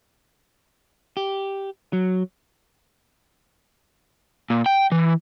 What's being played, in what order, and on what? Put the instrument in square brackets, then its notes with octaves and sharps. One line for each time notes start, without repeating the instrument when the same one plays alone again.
[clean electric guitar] G4
F#3
[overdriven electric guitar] A#2
G5
E3